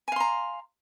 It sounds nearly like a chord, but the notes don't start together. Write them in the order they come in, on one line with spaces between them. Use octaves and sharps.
G#5 F5 C6 A#5